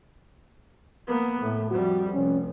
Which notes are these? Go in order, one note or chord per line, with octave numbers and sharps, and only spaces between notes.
A#3 B3
A2 A3
F2 G3 F#4
F1 C#4